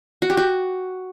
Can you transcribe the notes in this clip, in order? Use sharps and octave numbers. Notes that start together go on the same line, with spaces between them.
F#4
G4
F#4